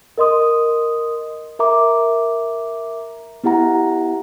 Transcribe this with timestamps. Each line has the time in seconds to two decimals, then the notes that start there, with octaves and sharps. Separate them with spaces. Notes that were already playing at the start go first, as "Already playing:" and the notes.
0.18 A#4 D#5 C6 D#6
1.59 A#4 E5 A#5 D6
3.44 B3 E4 G4 F#5 A#5